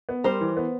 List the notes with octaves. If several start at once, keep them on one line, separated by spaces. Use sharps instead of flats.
B3
G3 A#4 C5
E3
B3